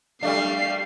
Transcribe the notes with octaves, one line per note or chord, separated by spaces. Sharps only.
G3 A3 D4 F5 C7